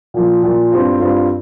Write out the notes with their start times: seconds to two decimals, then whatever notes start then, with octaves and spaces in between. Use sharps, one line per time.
0.14 A#2 F3 A#3
0.43 A#2 F3 A#3
0.72 G2 G3 C4 F4
1.00 G2 G3 C4 F4